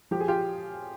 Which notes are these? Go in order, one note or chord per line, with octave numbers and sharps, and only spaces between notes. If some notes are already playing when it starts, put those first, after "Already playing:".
F3 G4
G#4
F4 G4